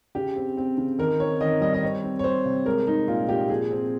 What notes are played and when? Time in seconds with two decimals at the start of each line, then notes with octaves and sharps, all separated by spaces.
0.15 C#3 G4
0.36 C4
0.57 C4
0.77 C#3
0.99 D#3 A#4
1.20 C4 C#5
1.41 D#3 D#5
1.61 G3 D#5
1.74 D#5
1.83 C4 C#5
2.03 C4
2.19 C#5
2.24 G3 C5
2.45 C3
2.66 G#3 A#4
2.86 G#3 D#4
3.08 A#2 F4
3.29 A#2 G4
3.49 F3 G#4
3.71 C4